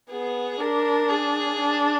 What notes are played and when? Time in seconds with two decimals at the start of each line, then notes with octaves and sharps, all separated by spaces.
0.10 B3 G#4
0.60 D4 A#4
1.09 G#4
1.59 D4